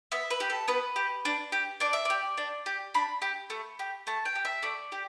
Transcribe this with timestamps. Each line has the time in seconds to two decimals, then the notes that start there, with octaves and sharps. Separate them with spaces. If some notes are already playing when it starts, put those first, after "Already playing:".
0.12 B3 E5
0.30 B4
0.40 G4
0.50 A4
0.68 B3 B4
0.96 G4
1.25 D4
1.52 G4
1.80 D4 D5
1.93 E5
2.05 G4 D5
2.37 D4
2.66 G4
2.94 D4 B5
3.22 G4
3.50 A3
3.79 G4
4.07 A3 A5
4.25 G5
4.35 G4
4.45 E5
4.63 A3 D5
4.92 G4